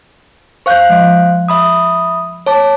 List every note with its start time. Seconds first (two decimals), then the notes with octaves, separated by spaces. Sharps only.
0.66 C5 F5 C#6 F#6 G6
0.89 F3 G#3
1.48 E5 B5 D#6
2.46 C#5 A5 D6